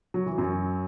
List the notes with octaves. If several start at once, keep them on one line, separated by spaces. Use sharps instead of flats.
F#3
E3
F#2 F#3